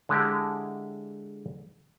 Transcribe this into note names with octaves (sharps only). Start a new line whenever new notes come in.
D3 G#3 E4 G4 A#4